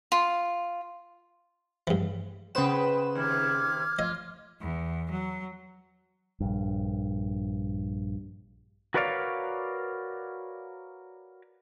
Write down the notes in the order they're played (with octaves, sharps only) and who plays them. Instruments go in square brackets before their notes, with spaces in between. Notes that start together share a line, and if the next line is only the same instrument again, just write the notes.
[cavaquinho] F4
[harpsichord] G2 E3
[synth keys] C#3 E7 [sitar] B3 B4 C5 [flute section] G5
[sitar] D#2 C3 [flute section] D6 F6 G#6
[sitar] F4 [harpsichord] D#5
[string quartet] E2
F#3
[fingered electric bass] A#1 G2
[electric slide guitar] F#4 A#4 B4 C#5 D5 F5